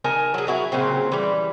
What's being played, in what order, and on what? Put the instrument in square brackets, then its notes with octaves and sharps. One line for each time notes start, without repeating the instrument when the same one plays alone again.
[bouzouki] D#4 A#4 G#5 A5
F#3 G#4
E4 F#4 A#4
A#2 C#3 F#3 C4
E3 G3